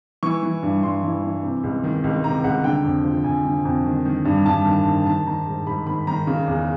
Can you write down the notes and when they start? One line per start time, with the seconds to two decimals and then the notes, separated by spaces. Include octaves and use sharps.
0.23 E3 C#6
0.43 E3
0.63 G2
0.83 G2 C6
1.03 E3
1.23 E3
1.43 C3
1.63 C#2
1.84 D#3
2.04 C#2
2.24 C3 A#5
2.44 C#2 F#5
2.64 D3 G5
2.85 F2
3.04 F3
3.24 F2 G#5
3.45 D3
3.65 F2
3.86 D#3
4.05 D#3
4.25 G2
4.46 G2 A5
4.66 D#3
4.86 D#3
5.06 D#3 A5
5.27 D#3 A#5
5.47 G#2
5.67 G#2 B5
5.87 D#3 B5
6.07 D#3 A#5
6.27 C#3
6.48 E2